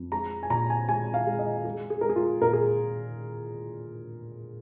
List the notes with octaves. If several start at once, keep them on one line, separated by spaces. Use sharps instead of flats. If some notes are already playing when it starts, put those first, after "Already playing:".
Already playing: F2
G#3 A#5
G#5
A#2 A#5
G#5
G#3 G#5
F5
G#3
D#5
G#3 G#4
G#4
G#3 A#4
G#4
F4
A#2 A#4
G#4